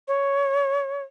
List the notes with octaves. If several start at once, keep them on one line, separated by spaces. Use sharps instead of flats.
C#5